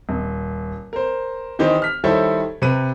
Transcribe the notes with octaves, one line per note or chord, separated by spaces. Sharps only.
D#1
A#4 C5
D#3 E3 D#4 G4 C5
F6 B6
D#3 G3 E4 A4 C5 C#5
C3 B4 D#7